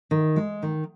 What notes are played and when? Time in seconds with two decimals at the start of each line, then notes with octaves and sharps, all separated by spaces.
0.11 D#3
0.36 G#3
0.63 D#3